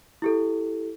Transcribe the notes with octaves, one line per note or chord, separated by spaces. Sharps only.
E4 G4 A4